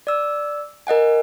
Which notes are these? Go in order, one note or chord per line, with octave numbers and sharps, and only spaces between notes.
D5 E6
A#4 D#5 F#5 G#5